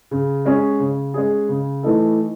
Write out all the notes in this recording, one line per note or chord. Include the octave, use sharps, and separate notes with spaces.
C#3
G#3 C#4 G#4
C#3
G#3 C#4 G#4
C#3
E3 A3 D#4 A4